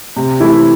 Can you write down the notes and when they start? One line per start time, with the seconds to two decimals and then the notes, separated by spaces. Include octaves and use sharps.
0.16 C3
0.40 E3 A3 E4